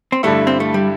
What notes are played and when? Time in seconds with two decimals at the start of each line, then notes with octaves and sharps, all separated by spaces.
0.12 C4
0.23 G2 D3 G3 A3 E4
0.47 C4
0.60 A3
0.74 G3